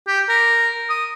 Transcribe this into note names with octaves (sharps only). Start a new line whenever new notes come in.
G4
A#4
D#6